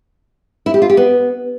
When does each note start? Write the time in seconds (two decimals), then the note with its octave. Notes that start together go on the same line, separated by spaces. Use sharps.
0.66 E4
0.74 G4
0.82 F4
0.90 G4
0.97 B3